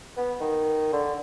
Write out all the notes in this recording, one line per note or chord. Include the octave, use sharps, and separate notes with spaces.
B3
D#3
D3